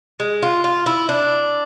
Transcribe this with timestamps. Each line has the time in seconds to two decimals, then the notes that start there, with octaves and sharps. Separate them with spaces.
0.20 G#3
0.42 F4
0.64 F4
0.86 E4
1.09 D4